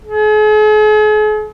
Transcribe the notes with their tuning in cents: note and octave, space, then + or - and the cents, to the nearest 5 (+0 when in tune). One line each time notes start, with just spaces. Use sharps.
G#4 +45